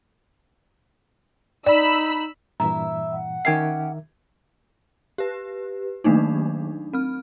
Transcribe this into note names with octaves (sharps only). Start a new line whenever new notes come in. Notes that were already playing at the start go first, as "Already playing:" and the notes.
D#4 D5 B5 E6
G2 A#2 E3 E4 E5 A#5
F#5
D#3 C#4 G4 A#4 E5 G#6 C7
G4 B4
D#3 F#3 A3 A#3 D4 D#4
C4 F6